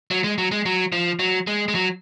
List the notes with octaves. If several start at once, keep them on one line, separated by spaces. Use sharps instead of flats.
F#3
G#3
F#3
G#3
F#3
F3
F#3
G#3
G#3
F#3